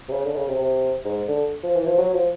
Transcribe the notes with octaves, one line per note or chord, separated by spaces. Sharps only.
C3
C#3
D3
C#3
C3
C3
G#2
D3
F3
E3
F3
F#3
F3